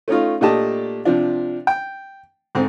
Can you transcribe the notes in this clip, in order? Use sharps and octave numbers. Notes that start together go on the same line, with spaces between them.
A3 C#4 D#4 F4
A#2 A3 D4 G4 D#5 A5
C3 F3 D4
G5
G#2 D3 C4